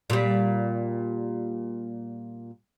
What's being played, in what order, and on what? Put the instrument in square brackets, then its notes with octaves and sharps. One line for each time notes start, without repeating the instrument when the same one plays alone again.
[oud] A#2 G3